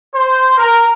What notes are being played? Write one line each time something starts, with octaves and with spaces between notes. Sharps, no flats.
C5
A#4